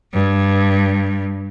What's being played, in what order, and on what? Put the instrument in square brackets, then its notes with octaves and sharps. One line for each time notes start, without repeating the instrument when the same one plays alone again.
[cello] G2